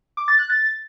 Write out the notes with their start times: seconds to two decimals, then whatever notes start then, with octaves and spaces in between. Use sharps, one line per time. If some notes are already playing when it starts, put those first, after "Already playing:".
0.17 D6
0.28 A6
0.39 F#6
0.50 A6